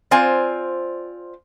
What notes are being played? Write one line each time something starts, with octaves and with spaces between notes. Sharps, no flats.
C4 F4 C5 D5 G#5